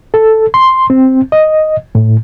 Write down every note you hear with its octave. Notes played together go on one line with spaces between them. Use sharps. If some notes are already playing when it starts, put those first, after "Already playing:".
A4
C6
C4
D#5
A2